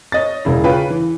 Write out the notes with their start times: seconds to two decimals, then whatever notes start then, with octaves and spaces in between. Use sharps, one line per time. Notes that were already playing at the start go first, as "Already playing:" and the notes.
0.12 C#5 D#5 A6
0.45 E1 C#3 E4
0.64 C#3 F4 B4 C#5 G5
0.90 E3